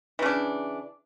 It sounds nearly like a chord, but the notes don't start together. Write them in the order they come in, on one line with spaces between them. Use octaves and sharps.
E3 C#3 D4